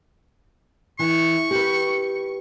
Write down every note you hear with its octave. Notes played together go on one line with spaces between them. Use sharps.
E3 C#6
G4 B4